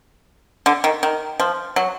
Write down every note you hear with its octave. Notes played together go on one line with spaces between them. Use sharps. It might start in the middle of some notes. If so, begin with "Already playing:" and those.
D3
D#3
D#3
F3
F#3